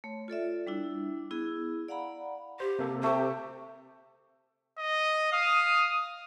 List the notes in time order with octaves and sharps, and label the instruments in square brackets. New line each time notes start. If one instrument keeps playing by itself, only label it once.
[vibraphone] A3 C#5
F4 A4 D5 E5
G3 D4 E4
B3 E4 G#4
D5 F5 F#5 A#5 B5
[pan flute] G4 [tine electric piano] C5
[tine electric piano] C3 A#3 A4
[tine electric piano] C3 [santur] A3 G4 [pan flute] C5
[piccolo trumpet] D#5
[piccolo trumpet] F5 [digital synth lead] D#6